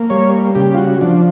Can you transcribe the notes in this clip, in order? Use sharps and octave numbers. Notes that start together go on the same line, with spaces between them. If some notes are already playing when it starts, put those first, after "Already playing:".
Already playing: A#3
G3 C#5
C#3 G4
F4
F#4
F3 D4